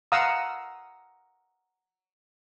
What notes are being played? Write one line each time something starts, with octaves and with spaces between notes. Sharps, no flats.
F5 F#5 A#5 D#6 E6